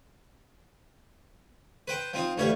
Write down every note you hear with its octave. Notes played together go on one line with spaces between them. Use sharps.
B4 C5 G5
F3 C4 D#4
D2 E3 G3 C#5 F5